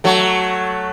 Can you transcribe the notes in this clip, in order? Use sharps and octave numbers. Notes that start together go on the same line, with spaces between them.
F#3 A3